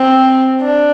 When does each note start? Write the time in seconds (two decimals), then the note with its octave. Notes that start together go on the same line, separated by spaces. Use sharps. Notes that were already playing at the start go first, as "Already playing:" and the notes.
Already playing: C4
0.62 D4